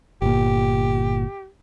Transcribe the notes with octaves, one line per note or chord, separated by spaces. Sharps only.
G1 A#2 G4